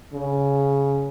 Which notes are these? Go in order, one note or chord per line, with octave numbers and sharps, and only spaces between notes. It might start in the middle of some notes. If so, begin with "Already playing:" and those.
C#3